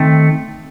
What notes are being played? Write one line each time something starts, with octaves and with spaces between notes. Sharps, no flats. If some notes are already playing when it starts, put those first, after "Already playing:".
Already playing: D#3 A3 C4